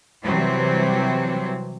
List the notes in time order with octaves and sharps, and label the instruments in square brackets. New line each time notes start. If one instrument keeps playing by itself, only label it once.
[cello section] C3 E3 F#3 G3 C4